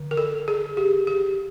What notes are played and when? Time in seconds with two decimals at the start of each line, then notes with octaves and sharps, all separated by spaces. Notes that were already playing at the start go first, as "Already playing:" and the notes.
Already playing: D3
0.11 A#4
0.17 A4
0.48 G#4
0.77 G4
1.07 G4